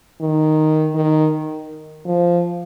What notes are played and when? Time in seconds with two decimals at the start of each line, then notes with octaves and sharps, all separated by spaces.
0.21 D#3
0.95 D#3
2.06 F3